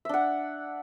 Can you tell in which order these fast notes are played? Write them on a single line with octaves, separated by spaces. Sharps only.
E5 D4 F#5